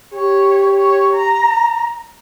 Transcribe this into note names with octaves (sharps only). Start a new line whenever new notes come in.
G4 C#5
C#5
A#5